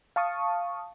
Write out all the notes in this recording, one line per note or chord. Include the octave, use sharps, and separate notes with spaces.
F5 A5 C#6 D#6